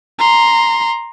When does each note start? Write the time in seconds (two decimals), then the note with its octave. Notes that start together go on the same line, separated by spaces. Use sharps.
0.19 A#5 C6